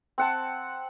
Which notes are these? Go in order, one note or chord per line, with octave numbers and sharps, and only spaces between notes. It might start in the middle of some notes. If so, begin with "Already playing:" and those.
C4 F#5 A5